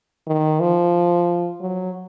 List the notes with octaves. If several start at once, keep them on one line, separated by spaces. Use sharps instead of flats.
D#3
F3
F#3